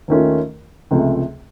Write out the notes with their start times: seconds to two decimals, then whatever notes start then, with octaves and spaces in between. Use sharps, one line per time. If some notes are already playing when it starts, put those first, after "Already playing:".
0.08 D#2 D#3 A3 C#4 F4
0.91 C#2 C3 F3 A3